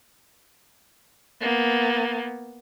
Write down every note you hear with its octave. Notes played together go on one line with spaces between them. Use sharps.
A#3 B3